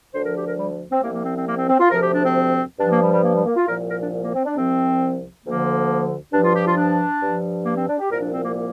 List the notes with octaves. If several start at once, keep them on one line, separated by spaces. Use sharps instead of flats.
D2 D3 F3 C5
A#4
G4
A#4
G3
C4
C2 C3 F3 A#3
A#3
C4
C4
A#3
C4
C4
F4
D2 C3 F3 A#4
G4
D4
C4
G2 F3 D4
A#3
G3
G3
A#3
G3
A#3
F4
C2 A#2 F3 A#4
A#4
D4
A#3
C4
D4
C2 C3 F3 C4
D2 D3 F3 A#3
G2 F3 D4
F4
G4
F4
D4
G2 F3
A#3
C4
D4
G4
C2 A#2 F3 A#4
D4
C4
A#3
A#3